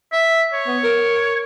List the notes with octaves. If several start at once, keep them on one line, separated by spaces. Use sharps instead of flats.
E5
C#5
B3
A#4